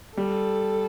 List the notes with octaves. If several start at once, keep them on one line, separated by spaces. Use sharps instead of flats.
G3 A4